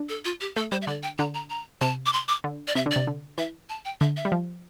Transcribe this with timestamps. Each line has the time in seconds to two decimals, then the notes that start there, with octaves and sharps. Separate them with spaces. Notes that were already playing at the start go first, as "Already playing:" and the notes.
Already playing: D4
0.09 A4
0.25 F4
0.41 G4
0.56 A3 A4
0.72 G3 C5
0.82 E5
0.87 D3 D5
1.03 G5
1.18 D3 A#5
1.34 A#5
1.50 A#5
1.81 C3 A5
2.06 D6
2.13 C6
2.28 D6
2.44 D3
2.68 D5
2.75 C3 E5
2.86 D3
2.91 C3 D5
3.07 D3
3.38 E3 E5
3.69 A5
3.85 G5
4.01 D3 E5
4.17 E5
4.25 G3
4.32 F3